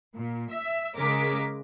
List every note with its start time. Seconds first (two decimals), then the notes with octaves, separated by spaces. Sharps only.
0.14 A#2
0.51 E5
0.96 C#3 G#3 A#4 D6 B6